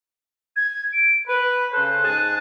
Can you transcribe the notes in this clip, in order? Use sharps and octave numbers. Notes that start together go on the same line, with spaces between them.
G#6
D7
B4 B5
C#3 A4 C5 F#6
G#2 G#4 A5